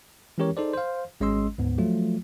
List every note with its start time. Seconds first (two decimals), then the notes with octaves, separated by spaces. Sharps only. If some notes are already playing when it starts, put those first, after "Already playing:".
0.38 E3 G#3 C#4 G4 A#4 C#5
0.57 D#4 G#4 A4 C5 D5
0.73 C5 F5
1.21 G#1 G#3 C#4 D#5 C6 E6
1.58 D2 G#2 B3
1.78 F3 F#3 A3 F4